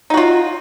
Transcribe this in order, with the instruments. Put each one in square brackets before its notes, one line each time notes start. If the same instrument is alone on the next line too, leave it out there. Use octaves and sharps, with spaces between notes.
[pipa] D#4
F#4
F4